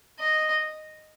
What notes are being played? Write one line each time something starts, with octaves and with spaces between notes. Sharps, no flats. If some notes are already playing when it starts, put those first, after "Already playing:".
D#5